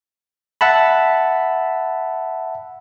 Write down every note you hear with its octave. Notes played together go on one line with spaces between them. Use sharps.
E5 F#5 A5 B5